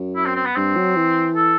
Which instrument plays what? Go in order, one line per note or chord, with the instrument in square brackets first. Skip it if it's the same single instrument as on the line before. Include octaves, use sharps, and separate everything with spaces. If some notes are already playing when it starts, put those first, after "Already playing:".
Already playing: [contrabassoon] F#2
[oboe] E4
C4
C4
B3
[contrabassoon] G2 [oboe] C4
[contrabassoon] F#3
E3
[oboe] A4